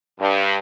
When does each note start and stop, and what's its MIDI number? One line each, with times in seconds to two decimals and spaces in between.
0.20 0.56 43